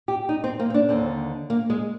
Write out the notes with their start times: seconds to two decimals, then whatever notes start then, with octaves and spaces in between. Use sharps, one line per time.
0.08 G4
0.29 D#4
0.44 C4
0.60 A#3
0.70 C4
0.74 D4
0.89 D#2 D3 C4
1.50 A#3
1.70 G#3